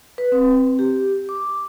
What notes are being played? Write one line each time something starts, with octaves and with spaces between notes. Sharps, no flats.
B4
C4
G4
D6